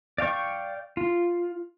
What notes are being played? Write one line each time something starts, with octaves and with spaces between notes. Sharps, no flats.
D5 F5 G5 C#6
F4